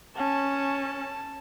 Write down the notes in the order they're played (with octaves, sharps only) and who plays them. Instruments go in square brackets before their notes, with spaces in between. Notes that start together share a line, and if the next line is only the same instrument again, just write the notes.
[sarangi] C#4 [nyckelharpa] A5